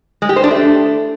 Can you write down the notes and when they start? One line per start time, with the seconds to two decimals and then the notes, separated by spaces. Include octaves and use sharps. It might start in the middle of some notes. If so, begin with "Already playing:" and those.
0.22 G#3
0.29 G4
0.36 C5
0.44 D4
0.51 A3